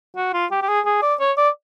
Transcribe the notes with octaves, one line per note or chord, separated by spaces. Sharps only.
F#4
F4
G4
G4
G#4
G#4
D5
C#5
D5